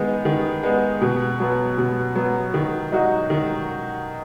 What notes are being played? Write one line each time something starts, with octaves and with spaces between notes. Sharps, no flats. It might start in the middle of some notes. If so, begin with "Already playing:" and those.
Already playing: D#3 G#3 B3
D#3
G#3 B3
B2
F#3 B3
B2
F#3 B3
D#3
F#3 D#4 F#4
D#3